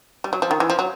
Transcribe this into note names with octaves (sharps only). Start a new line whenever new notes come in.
G3
F#3
F3
D#3
E3
F3
F#3